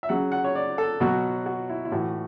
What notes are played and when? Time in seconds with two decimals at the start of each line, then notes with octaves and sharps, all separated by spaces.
0.03 E5
0.09 C#3 F#3 F#5
0.32 F#5
0.44 C#5
0.55 D5
0.78 A4
1.00 B2 F#3 F#4
1.46 F#4
1.69 E4
1.85 E4
1.92 A2 E3 F#4